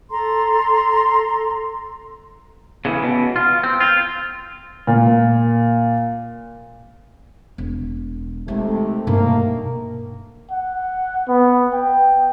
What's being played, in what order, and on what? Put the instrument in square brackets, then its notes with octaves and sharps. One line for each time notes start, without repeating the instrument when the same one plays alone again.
[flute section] A4 A#5 C6
[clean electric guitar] C#3 E3
B2
F4
C4
F4
[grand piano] A#2
[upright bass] E1
[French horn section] C3 D#3 A3 [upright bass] G#3 C4
[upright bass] G2 B2 [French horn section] D#3 A3 A#3
[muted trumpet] F#5
B3
G5